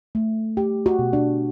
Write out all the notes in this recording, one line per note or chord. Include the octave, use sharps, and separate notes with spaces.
A3
A3 G4
F#4
B2
D4